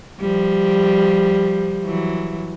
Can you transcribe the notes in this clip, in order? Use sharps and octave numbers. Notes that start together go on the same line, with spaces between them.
F3 G3
E3 F#3